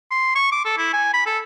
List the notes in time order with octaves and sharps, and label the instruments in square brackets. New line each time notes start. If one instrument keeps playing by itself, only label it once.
[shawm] C6
C#6
D6
A4
E4
G#5
B5
A4